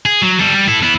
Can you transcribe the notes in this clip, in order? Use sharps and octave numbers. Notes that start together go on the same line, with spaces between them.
G#4
F#3
G3 A4
G3
E4 A4
B3 E4